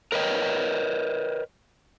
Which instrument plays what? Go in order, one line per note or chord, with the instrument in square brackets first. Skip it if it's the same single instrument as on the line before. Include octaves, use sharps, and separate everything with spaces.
[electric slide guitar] A#4 B4 C#5 D#5 G5